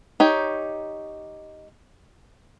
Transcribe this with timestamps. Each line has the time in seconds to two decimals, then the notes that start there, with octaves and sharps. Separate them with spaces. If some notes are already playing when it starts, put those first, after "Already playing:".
0.20 D#4 G4 C#5